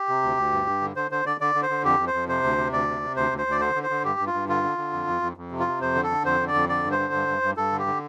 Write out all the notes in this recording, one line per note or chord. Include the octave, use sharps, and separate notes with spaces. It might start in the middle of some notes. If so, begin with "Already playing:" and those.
Already playing: G4
C3
D2
D2
G2
G2
D3
D3 C5
D3 C5
D3 D5
D3 D5
D3
C5
D3
F2 G4
F2
C5
F2
C3 C5
D2
C3
D2 D5
C3
C3
D2 C5
D2
C5
D2 D5
D3 C5
D3
C5
D3
G2 G4
G2
F4
G2
D3 F4
D3
D3
F2
F2
F2
F2
C3
F4
C3
F2 C5
D3
A4
D3
F2 C5
D3
D5
F2
D3 D5
G2
C5
D3
G2
G2
G2
G2 A4
D3
G4
D3